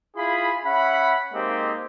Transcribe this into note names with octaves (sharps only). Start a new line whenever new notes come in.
E4 F4 G#4 B5
C#4 E5 F#5 B5
G#3 A#3 C4 D#4 G4